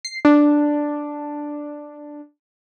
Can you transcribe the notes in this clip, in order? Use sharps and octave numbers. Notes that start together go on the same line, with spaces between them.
C7
D4